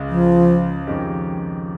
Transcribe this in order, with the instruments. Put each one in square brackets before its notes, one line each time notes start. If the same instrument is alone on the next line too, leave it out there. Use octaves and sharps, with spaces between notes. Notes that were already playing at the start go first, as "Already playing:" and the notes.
Already playing: [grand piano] C#2 C#3 G#3
[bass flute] F3
[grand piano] F2 D#3 G#3 C#4 G4